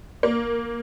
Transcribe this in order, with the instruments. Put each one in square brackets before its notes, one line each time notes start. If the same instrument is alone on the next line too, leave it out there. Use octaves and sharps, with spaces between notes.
[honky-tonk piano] A#3